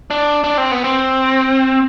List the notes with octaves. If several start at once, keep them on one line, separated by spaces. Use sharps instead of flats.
D4
D4
C4
B3
C4